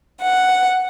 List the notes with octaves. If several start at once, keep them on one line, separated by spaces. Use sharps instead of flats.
F#5